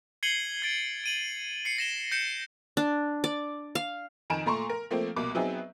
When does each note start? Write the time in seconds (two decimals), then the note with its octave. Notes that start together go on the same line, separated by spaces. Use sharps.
0.23 G#6 C7 C#7 D#7 F#7 G7
0.62 G#6 A6 D7
1.04 D7 D#7 F#7
1.65 C7 C#7 D#7
1.78 A#6 E7 G7
2.12 G6 A#6 C#7 D7 E7
2.77 D4
3.24 D5
3.75 F5
4.30 F2 D#3 G#5 A#5 D7 E7
4.46 A#2 A3 A#5 C6 C#6
4.70 A#4
4.90 F3 A3 A#3 C4
5.16 C2 B2 A#3 D6
5.35 F#3 B3 C4 D#4 G#4 E5